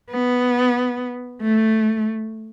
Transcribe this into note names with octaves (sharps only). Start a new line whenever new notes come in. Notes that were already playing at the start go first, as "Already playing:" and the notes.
B3
A3